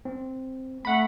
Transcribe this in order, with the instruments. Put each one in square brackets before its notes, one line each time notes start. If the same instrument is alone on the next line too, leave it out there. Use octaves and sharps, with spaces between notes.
[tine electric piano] C4
[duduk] A3 [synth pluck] F#5 B5 [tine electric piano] B6